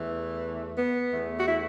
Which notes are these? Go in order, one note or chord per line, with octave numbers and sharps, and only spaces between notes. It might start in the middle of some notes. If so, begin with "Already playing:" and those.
Already playing: E2 E3 A3
B3
E2 E3 A3
F#4
E4